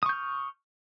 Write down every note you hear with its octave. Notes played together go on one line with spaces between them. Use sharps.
C#6 D#6 F6 G6